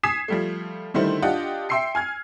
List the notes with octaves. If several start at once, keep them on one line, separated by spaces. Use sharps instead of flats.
G#5 D#6 G#6 B6 C7 E7
F3 G3 A3
D3 D#3 G3 A3 E4 C5
D4 F4 G4 D#5 F#5 A5
E5 G5 C6 E6 C7 C#7
G#5 F6 G#6